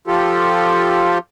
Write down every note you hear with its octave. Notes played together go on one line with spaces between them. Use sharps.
F3 F4 G4 A4